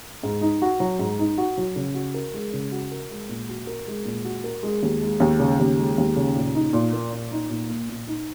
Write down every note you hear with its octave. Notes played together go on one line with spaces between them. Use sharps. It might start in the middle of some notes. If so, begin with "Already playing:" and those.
G#2
D#4
F#4
F#3
G#2
D#4
F#4
F#3
C#3
F#4
A#4
G#3
C#3
F#4
A#4
G#3
A#2
F#4
A#4
G#3
A#2
F#4
A#4
G#3
D#2
G#3
D#2
C#3
D#2
G#3
D#2
C#3
A#2
D#4
A#2
A#3
A#2
D#4
A#2
A#3
A#2
D#4